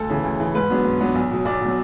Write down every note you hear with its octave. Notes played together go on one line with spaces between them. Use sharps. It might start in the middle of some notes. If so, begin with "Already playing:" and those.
Already playing: D2 A4
C#3 E3
D2
C#3 E3
G#2 B4
F#3 B3 D4
G#2
F#3 B3 D4
B1
B2 F#3
B1 D5
B2 F#3